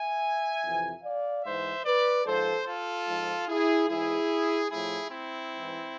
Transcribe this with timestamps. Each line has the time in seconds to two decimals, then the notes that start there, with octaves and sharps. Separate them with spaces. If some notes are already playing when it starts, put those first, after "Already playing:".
Already playing: E5 G#5
0.63 F2 C3 E3
1.04 D5 F5
1.44 G#2 E3 C5 E5
1.85 B4 D5
2.25 G#2 F3 A4 C5
2.66 F4 A4
3.07 G#2 F3
3.48 E4 G#4
3.89 G#2 E3 E4 G#4
4.71 A2 F3 E4 G#4
5.11 C4 E4
5.52 G#2 E3